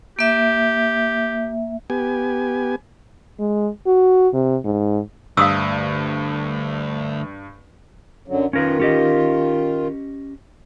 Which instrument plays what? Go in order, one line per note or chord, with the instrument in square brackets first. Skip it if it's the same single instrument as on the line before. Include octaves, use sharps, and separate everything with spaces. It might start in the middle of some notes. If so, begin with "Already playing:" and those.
[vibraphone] A#3 E5 [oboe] G4
[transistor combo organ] B3 G4 G#5
[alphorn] G#3
F#4
C3
G#2
[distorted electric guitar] D2 [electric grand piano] G2 [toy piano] F5 D#6 E6
[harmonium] F#2 D3 F#3
[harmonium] D#3 F4 [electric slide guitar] C#4 A#4 B4
[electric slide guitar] C#4 G4 D#5